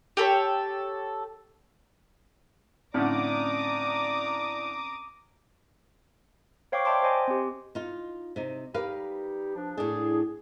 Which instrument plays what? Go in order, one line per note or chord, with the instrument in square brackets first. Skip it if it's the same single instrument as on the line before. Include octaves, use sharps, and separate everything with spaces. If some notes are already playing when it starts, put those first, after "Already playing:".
[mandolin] G4 A4 A#4 C#5
[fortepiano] A2 D3 [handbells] C4 C#4 [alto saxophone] D5 [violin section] A#5 D6 D#6
[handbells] C5 C#5 F5 G5 C#6 D6
D5 E5 G5 A5 C6 D6
C5 D#5 G#5 C6
C4 G4
[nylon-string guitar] D#4 F4
C3 D#4
[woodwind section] G3 D#4 G4 [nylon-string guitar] A#4 B4 F5
[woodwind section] F3 D4
[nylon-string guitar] A2 D4 [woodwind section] G#4